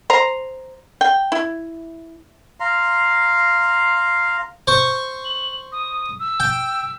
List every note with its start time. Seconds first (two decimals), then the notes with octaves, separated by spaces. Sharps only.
0.10 C5 A#5
1.01 G5
1.32 E4
2.60 F5 A#5 C6
4.67 C5 C#6
5.25 F#7
5.72 D#6
6.19 E6
6.40 G5